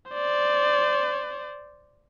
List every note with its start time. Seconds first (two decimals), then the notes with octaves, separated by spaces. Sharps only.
0.12 C5 D5